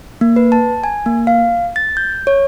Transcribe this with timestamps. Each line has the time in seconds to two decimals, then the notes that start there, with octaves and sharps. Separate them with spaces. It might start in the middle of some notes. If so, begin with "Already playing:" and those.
0.21 A#3
0.36 B4
0.52 A5
0.84 G#5
1.06 A#3
1.27 F5
1.76 A6
1.97 G6
2.27 C#5